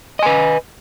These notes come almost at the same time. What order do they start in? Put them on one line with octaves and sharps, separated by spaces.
D#5 G#5 B4